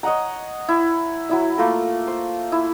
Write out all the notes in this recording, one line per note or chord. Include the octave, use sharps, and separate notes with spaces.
C#5 D#5 F#5 A#5
E4
F#3 E4 E5
A3 A#3 F4 A#4
C5
E4